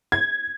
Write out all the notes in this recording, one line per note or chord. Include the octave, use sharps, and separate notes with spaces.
G#6